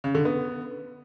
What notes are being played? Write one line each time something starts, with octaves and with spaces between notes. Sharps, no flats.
C#3
D3
B3